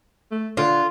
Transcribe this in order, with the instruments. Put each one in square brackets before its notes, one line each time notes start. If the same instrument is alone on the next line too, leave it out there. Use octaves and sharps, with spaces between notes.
[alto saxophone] A3
[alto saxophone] D3 [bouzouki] F4